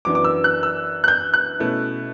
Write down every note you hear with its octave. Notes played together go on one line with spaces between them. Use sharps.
F#2 E3 B3 D4 D6
D6
E6
F#6
E6
F#6
G6
F#6
B2 A3 C#4 E4